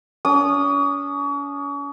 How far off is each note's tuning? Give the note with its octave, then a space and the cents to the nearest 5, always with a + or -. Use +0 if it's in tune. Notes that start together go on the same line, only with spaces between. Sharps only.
C#4 +40 D#6 -20